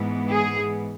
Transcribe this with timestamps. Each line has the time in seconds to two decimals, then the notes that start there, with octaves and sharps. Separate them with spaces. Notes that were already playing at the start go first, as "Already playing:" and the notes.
Already playing: G#2 E3 B3
0.31 G#4